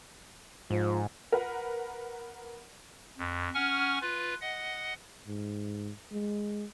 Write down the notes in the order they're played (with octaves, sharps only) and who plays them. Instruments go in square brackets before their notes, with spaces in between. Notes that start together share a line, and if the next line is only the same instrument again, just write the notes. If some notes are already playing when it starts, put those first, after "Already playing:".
[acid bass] G#2 [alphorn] F3
[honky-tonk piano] A#4 B4 F#5
[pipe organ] F2
C#4 F#5 G#5 C#6 F6
F4 B4
D#5 F#5
[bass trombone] G#2
G#3